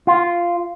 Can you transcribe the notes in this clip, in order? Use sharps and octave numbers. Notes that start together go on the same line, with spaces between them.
F4